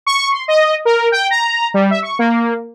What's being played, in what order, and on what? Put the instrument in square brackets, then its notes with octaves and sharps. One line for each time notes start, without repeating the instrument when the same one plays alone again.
[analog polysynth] C#6
C6
D#5
A#4
G5
A#5
G3
E5
C#6
A#3